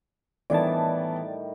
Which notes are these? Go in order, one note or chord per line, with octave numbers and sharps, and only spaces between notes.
A2 D#3 E3 G3 B3 E4 D5 A5